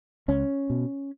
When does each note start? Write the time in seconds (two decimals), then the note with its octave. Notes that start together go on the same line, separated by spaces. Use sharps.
0.28 C#2 C#4
0.70 B2